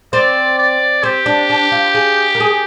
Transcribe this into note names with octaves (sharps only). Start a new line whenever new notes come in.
C4 D5
D5
C4 G4
D4
D4
F4
G#4
A#4
G#4